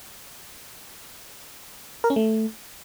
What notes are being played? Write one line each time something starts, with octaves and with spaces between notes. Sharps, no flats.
A#4
C#4
A3